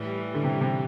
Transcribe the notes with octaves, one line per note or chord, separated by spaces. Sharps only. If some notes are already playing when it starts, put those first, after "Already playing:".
Already playing: A2 E3 G3
D3
C3
C3